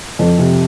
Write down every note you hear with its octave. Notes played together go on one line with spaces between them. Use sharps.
F2
C3